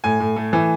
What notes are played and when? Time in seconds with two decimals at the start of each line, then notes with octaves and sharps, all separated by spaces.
0.04 A2 G#5
0.20 A2
0.36 A3
0.53 E3